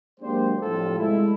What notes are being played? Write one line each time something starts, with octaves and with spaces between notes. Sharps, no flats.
F#3 G#3 A#3 D4 G4 C5
A2 C3 F3 G3 F4 A4
G#3 A3 E4